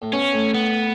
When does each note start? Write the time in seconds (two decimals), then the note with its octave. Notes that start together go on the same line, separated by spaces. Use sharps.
0.02 A2
0.13 B2 C#4
0.33 A2
0.55 B3